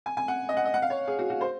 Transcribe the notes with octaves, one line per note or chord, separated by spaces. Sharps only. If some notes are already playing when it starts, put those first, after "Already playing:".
G#5
G#5
F#5
D#5
F#5
D#5
F#5
F5
C#5
G#4
F#4
F#4
C5